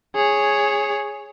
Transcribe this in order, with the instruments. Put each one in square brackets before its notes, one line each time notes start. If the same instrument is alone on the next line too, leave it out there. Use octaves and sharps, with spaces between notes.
[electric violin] G#4 C#5